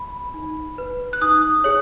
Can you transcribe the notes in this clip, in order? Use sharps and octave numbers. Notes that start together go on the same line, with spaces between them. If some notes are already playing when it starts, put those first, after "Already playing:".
Already playing: B5
D#4
B4
F#6
D#4 D#6
G#4 C#5